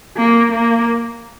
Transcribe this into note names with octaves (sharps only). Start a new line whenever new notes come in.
A#3
A#3